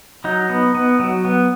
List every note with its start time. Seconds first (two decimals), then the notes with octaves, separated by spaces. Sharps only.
0.24 F#3 D#4
0.50 B3
0.75 B3
0.99 F#3
1.25 B3